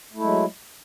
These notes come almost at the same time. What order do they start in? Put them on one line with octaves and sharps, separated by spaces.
A3 E4 G#3 F#3